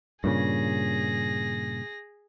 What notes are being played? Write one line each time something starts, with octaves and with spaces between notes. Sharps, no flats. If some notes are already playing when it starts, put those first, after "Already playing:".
G2 A#2 C#3 G#4 A#6